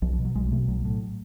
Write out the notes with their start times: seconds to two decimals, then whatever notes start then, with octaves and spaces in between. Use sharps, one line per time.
0.02 B1 F3
0.13 F3
0.18 B2
0.25 F#3
0.35 B1 G#3
0.52 B2 A3
0.68 B1 F#3
0.85 A2